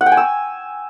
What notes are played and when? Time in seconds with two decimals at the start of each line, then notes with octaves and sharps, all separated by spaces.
0.01 F#5
0.06 G5
0.12 G#5
0.17 E6